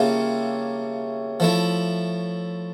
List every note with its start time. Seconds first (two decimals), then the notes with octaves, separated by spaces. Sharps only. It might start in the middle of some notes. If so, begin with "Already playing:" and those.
Already playing: C#3 G3 A#3 D4 F4 C#5 E5
1.40 F3 A3 E4